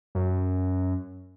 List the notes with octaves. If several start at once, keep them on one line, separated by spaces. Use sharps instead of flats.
F#2